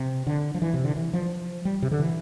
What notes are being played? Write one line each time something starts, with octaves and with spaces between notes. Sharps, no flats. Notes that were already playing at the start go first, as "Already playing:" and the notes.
Already playing: C3
D3
F3
E3
C3
D3
E3
F3
G3
C3
D3
E3